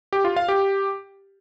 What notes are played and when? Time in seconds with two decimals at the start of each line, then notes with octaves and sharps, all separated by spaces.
0.13 G4
0.25 F4
0.36 F5
0.48 G4